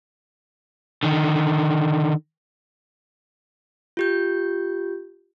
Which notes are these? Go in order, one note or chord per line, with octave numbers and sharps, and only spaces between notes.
D3 D#3
F4 G4 G6